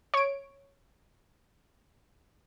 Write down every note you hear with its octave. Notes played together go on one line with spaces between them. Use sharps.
C#5 D7